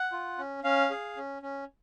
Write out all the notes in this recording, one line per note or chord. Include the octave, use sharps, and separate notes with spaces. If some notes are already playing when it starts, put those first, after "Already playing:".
Already playing: F#5
F4
C#4
C#4 F5
G#4
C#4
C#4